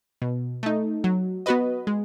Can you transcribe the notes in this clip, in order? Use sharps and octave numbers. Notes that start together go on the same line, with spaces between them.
B2
A3 D#4
F#3
B3 F#4 B4 D#5
G#3